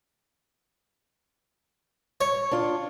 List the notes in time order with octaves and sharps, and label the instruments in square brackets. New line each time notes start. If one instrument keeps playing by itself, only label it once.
[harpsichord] C#5
[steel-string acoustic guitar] D4 F4